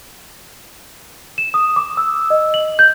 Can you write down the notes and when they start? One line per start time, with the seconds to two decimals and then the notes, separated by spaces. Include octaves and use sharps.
1.38 E7
1.54 D#6
1.76 D6
1.97 E6
2.30 D#5
2.54 F#7
2.79 G6